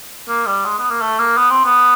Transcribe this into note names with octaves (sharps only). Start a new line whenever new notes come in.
A#3
G3
G#3
B3
A#3
A3
A#3
B3
C4
B3